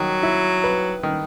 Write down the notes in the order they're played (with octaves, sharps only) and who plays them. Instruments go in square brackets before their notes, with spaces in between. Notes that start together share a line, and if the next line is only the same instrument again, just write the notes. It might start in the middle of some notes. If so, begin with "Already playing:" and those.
Already playing: [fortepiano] D#3 [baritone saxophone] F#3
[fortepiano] E4
B4
D#3